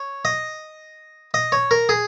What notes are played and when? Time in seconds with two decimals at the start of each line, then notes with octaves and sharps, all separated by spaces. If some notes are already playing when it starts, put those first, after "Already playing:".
Already playing: C#5
0.25 D#5
1.34 D#5
1.52 C#5
1.71 A#4
1.89 G#4